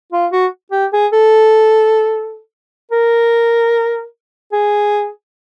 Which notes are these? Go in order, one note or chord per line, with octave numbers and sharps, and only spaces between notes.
F4
F#4
G4
G#4
A4
A#4
G#4